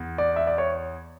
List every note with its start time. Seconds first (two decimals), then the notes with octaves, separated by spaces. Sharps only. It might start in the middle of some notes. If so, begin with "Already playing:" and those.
Already playing: E2
0.18 D5
0.36 E5
0.47 D5
0.58 C#5